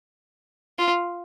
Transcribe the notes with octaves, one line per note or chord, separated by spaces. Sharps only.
F4